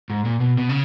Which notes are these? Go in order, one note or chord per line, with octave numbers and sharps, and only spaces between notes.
G#2
A#2
B2
B2
C#3